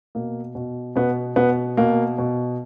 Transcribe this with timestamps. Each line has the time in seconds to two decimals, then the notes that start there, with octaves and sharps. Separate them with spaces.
0.15 B2 A#3
0.55 B2
0.96 B2 B3
1.36 B2 B3
1.77 B2 A#3
2.18 B2